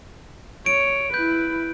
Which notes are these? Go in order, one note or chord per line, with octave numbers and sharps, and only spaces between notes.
C#5 D7
E4 B4 G6